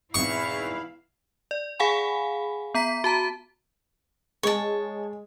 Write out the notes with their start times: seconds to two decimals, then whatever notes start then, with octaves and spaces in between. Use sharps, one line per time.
0.14 E2 G#2 B2 C4 E4 F5 C#6
1.51 D5
1.79 G#4 F5 F#5 G#5 B5
2.74 B3 A#5 B6
3.04 F#4 A5 A#5
4.43 G#3 C#5 A5